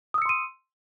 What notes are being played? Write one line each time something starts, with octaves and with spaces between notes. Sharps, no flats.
C6 D#6 E6 C#7 D#7